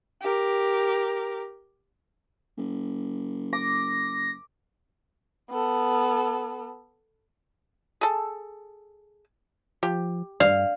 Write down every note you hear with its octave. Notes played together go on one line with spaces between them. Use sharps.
G4 A#4
F#1
D6 A#6
B3 A4
G#4 A4
F3 G4
G2 D5 F5